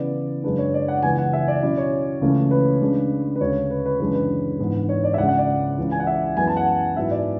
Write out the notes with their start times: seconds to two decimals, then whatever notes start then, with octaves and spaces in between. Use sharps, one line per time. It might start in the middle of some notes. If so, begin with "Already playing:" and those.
Already playing: C#3 E3 B3 D5
0.43 F#2 C#3 G#3 D4 B4
0.58 C#5
0.74 D5
0.88 F#5
1.03 C#2 C#3 E3 B3 G#5
1.18 F#5
1.33 E5
1.48 D5
1.62 B2 F#3 C#4 E4 D5
1.78 C#5
2.21 C#2 C#3 E3 A3 C#4
2.51 B4
2.81 C#3 G#3 D4
3.36 B4
3.41 D2 C#3 G#3 C#5
3.70 B4
3.86 B4
3.99 F#2 C#3 E3 G#3 D4 B4
4.14 B4
4.59 G#2 E3 B3 D4
4.89 C#5
5.04 D5
5.14 E5
5.18 C#2 C#3 G#3 F#5
5.28 F#5
5.38 D5
5.78 C#2 C#3 E3
5.91 G#5
6.00 F#5
6.07 E5
6.37 F#2 E3 G#3 B3 E4 G#5
6.47 A5
6.57 F#5
6.97 G#2 F#3 B3 E4 E5
7.11 D5